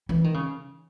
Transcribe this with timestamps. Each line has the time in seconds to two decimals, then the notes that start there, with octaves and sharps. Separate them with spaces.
0.09 E3
0.24 D#3
0.34 C#3